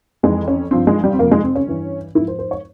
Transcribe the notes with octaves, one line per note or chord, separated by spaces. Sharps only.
F2 E3 G#3
C#4
G2 F3 C4
G#3
G3
C4
F2 C3 F3 A#3
G#3
C4
C#4
G2 E3
G#2 E4
F3
C5
C5
C#5